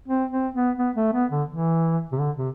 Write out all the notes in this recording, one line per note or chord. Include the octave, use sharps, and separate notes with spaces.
C4
C4
B3
B3
A3
B3
D3
E3
C3
D3
C3